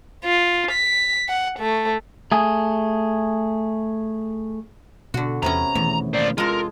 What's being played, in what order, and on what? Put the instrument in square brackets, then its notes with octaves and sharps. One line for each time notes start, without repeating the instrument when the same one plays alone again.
[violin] F4
B6
F#5
A3
[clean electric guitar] A3 G#4
[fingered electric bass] B2 [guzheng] D3 F#4
[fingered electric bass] E2 E3 [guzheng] C3 B3 C#4 [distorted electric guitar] A#5
[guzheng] E2 [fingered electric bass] B2 D#3 A3
[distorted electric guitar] A#3 C5 [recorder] D5
[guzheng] G#3 A4 [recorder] F4 [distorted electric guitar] A#4